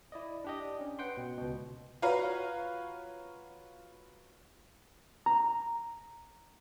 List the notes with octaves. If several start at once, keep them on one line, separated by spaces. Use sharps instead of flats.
E4 D5 D#5
D4 G4 D#5
C#4
B4 F#5 G5 C6
B2
C#2 B2
F4 F#4 B4 C#5 F5 A#5
A#5